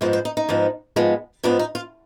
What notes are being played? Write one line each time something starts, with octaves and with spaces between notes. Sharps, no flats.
G#2 F3 G#3 B3 C5
C5
D#4
D#4
G#2 F3 G#3 B3
G#2 F3 G#3 B3
G#2 F3 G#3 B3 D4
D#4
F4